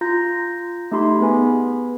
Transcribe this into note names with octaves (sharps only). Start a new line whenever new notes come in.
F4 A#5 G6 A#6
A3 D#4 G4 B5 C6
B3 G#4 B4 G#5 B5